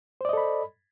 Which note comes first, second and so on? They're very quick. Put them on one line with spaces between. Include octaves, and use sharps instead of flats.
C5 D5 D#5 A4 B5